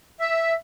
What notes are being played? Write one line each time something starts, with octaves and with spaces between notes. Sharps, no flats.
E5